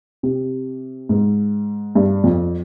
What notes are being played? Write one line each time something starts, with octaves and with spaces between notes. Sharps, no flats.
C3
G#2
G2
F2